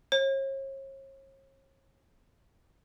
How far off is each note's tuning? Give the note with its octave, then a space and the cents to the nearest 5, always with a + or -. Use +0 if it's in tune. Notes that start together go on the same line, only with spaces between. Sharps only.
C#5 -40